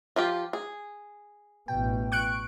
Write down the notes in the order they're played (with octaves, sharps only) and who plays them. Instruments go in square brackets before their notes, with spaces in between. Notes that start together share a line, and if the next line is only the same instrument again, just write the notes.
[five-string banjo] F3 F4 G4
G#4
[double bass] A1 B2 [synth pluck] G5
[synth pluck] C#6 F#6 D7